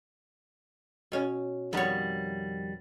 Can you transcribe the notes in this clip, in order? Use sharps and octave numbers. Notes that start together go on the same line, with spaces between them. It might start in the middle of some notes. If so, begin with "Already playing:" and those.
B2 C#4
F2 D#3 G3 B3 C#5